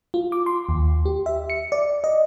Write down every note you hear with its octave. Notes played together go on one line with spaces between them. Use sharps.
F4
D6
C6
D#2
G4
E5
C#7
D5
D#5